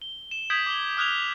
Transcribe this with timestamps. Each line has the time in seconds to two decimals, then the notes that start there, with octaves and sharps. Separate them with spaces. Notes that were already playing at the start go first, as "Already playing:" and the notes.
0.02 G7
0.31 E7
0.50 D#6 G6 G#6 B6 D7 F#7
0.66 D6 G7
0.97 D#6 F6 F#6 G#6 F7